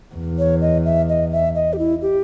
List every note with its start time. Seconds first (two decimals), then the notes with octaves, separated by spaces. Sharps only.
0.15 E2
0.39 C#5
0.61 D#5
0.85 E5
1.09 D#5
1.33 E5
1.55 D#5
1.73 G4
1.79 E4
2.02 G4